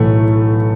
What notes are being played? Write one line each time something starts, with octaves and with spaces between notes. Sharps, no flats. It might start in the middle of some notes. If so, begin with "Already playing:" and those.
Already playing: B1 A2 E3 A3